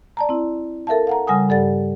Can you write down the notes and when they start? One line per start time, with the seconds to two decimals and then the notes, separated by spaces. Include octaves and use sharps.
0.17 D5 A5 A#5
0.29 C4 E4
0.87 A4 A#4 E5 F5 A5
1.07 F5 F#5 A#5
1.27 C#3 G3 F#5 G#5 D#6
1.49 G2 G4 A4 D5 F#5 A6